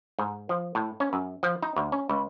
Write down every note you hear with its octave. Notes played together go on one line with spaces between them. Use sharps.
G#2
F3
A2
C#4
F#2
F3
D#4
D2
C#4
C#2